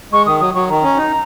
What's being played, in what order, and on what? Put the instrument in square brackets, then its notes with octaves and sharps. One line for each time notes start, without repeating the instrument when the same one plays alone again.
[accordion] G#3 [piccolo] C#6
[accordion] D#3 [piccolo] D#6
[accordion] F#3 [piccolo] D#6
[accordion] F#3 [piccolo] C#6
[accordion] D#3 [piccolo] A#5
[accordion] C#4
D#4